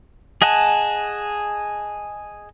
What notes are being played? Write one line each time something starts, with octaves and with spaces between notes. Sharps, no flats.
G#4 D#5 F#5 G#5 A5